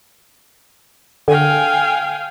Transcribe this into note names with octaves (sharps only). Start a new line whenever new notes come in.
D3 F5 G5 G#5